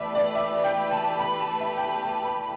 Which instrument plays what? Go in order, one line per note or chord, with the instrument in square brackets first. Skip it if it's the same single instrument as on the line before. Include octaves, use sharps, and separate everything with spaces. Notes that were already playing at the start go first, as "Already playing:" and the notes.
Already playing: [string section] E2 E3 A3 G4 B4 [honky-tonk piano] D5 E5 A5
[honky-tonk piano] D5
E5
G5
A5
B5
A5
E5
G5
A5
A5
B5